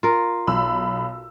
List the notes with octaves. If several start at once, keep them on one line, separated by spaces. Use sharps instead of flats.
F4 A#4
B1 B5 E6